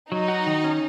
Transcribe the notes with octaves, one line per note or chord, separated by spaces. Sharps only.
F#3 D#4
F#4
D#3
C#4